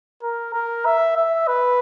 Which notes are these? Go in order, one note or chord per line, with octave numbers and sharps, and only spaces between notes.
A#4
A#4
E5
E5
B4